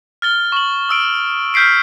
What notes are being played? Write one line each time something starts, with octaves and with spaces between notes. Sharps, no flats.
F6 A6 G7
C#6 F#7
D#6 E6 D7
F6 G6 B6 C7 D7